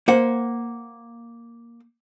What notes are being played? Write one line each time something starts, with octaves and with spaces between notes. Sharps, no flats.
A#3 C5 F#5